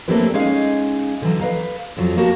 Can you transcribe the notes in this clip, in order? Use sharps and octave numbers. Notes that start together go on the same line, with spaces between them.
A3 A#3 C4 D4 G4 B4
G#3 C#4 D#4 G#4 F5
D3 E3 F#3
B4 D#5 F5 A#5
F2 F3 F#3
A#3 F#4 G4 A#4 A5